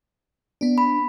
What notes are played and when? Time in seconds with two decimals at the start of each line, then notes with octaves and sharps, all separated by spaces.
0.61 B3 D4
0.78 B5